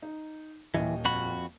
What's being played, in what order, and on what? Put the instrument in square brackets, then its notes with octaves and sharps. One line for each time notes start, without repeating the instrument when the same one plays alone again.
[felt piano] D#4
[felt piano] D#1 D#2 D#5 [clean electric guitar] E3
[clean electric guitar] F2 F#4 B5